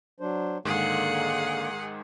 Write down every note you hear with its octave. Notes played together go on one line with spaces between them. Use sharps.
F#3 D4 C5
G#2 D3 D#3 G#3 A#3 G#4 F#5